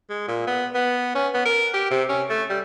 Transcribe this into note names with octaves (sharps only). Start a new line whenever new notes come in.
G#3
A#2
B3
B3
C#4
B3
A#4
G4
C3
C#4
A3
G3